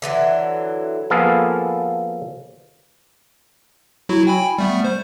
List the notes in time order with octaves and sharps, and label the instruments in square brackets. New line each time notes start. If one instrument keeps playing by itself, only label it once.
[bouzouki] D3 E3 F#3
[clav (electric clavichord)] F3 A#3 B3 G#4 A4 F5
[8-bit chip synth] F#3 E4 F#4
G5 G#5 B5
G3 A3 B3
C5